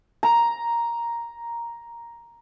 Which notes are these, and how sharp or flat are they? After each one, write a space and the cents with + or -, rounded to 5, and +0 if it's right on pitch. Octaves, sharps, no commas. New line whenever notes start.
A#5 +5